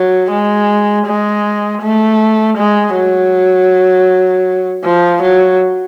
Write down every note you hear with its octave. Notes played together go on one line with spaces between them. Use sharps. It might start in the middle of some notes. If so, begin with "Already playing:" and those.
Already playing: F#3
G#3
G#3
A3
G#3
F#3
F3
F#3